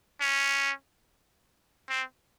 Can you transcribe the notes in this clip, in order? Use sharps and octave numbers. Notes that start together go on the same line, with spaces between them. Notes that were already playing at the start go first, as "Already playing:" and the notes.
C#4
C4